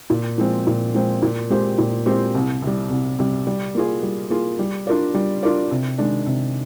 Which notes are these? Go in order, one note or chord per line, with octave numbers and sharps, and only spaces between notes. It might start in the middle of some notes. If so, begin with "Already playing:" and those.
A#2
F3 G#3 C4
A#2
F3 G#3 C4
A#2
G#3 C4 G4 C5
A#2
G#3 C4 G4 C5
C2
C3 G3
C2
C3 G3
G3
A#3 F4 G#4
G3
A#3 F4 G#4
G3
D4 F4 A#4 D5
G3
D4 F4 A#4 D5
C3
D#3 G#3 D4
C3